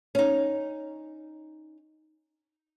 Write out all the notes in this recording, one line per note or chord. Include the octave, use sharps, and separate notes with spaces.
C#4 D#4